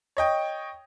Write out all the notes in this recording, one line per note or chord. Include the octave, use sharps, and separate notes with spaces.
C#5 D#5 G5